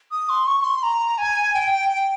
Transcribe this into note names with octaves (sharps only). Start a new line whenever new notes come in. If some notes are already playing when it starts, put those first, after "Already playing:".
D#6
C6
C#6
C#6
C6
A#5
G#5
G5
G5
G5